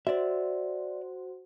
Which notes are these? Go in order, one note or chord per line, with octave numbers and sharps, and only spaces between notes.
F#4 C5 D5 E5